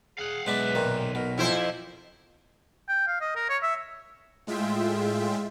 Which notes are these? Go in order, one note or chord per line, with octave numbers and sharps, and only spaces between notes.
G#4 F5 F#5
B1 G#3 B3 D4 B4 E5
A#2 D#3
B2 A#4
F2 E4 F4 C5
G5
F5
D#5
A#4
C#5
E5
A2 G#3 F4 E5 G5